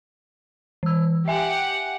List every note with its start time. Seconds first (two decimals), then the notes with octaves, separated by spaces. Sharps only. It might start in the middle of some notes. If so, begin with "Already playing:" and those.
0.83 E3 E6
1.28 G4 E5 F#5 G#5